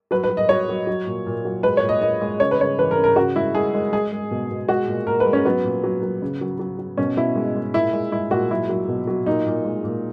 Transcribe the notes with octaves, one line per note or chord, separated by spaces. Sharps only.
F#3 B4
B4
F#3
D#5
F#3 C#5
F#3
F#3
A#2
A#2
F#3
G#3 B4
C#5
A#2
D#5
A#2 D#5
G#3
C#3 C#5
B4
C#3 C#5
E3 B4
A#4
C#3
A#4
C#3 F#4
G#3 E4
G#3 G#4
G#3
G#3 G#4
G#3
B2
B2
G#3 F#4
A#2
A#2 A#4
B4
G#3
C#4
F#3 B3
A#2
F#3
F#3
C#3
F#3
F#3
F#3
B2 C#4
B2 E4
G#3
G#3
A#2 E4
G#3
G#3 E4
A#2 F#4
F#3 E4
F#3
B2
F#3
A#2 D#4
A#2
G#3
A#2